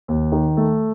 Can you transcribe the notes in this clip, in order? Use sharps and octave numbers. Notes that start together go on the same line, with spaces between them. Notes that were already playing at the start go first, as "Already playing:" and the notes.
D#2
D#3
A3